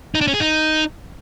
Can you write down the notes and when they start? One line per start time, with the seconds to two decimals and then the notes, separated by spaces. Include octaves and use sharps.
0.15 D#4
0.21 D4
0.27 C#4
0.34 G#4
0.40 D#4